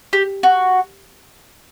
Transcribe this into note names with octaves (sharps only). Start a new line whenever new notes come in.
G4
F#4